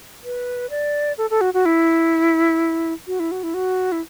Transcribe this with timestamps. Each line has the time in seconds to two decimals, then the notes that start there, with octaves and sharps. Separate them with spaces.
0.24 B4
0.70 D5
1.18 A4
1.30 A4
1.41 F#4
1.54 F#4
1.66 E4
3.07 F#4
3.20 E4
3.31 F#4
3.43 E4
3.54 F#4
3.92 E4